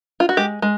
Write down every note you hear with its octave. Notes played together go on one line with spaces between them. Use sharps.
F4
F#4
G#3 G4
G#3